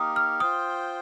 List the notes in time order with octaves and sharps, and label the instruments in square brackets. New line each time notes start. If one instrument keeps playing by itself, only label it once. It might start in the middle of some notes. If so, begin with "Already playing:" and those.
Already playing: [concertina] A#3 D#4 G4 A#4 [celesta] D#6 F6
[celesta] F6
[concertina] F4 C5 G5 [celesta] D#6